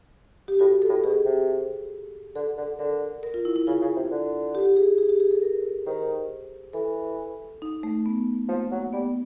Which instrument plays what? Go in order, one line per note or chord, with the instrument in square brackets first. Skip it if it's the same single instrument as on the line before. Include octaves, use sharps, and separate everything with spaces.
[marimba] G4
[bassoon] A2 [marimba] F#4
[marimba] A4
[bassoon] A2
[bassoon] B2 [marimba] G#4
[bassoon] C3
[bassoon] D3 [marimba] A4
[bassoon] D3
[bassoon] D3 [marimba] A#4
[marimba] A#4
F4
E4
E4
[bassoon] C#3 [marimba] F4
[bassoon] C#3
C3
D3
[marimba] G4
G4
G#4
G#4
G4
G#4
A4
A#4
[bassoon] D#3 [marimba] C5
[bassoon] E3 [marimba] A4
[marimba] D#4
A3
B3
[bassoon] F3 [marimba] A#3
[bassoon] F#3
[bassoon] G3 [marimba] B3